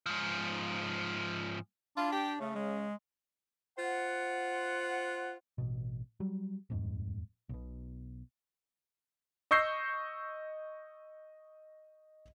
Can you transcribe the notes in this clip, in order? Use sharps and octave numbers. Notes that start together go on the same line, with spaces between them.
G#2 F3
D4 E4 F4
G4
C#3 A3
G#3
F4 C5 F#5
A1 B2
F#3 G3
D#1 F2 G#2
B1 B2
D#5 C#6 E6 G6 A#6 C7